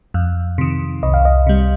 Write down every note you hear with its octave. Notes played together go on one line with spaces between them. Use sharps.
F2
C3 D#3
C2 D#5
F5
D#5
C3 G3